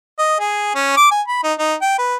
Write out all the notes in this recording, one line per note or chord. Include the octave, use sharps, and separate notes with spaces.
D#5
G#4
C#4
D6
G#5
B5
D#4
D#4
G5
B4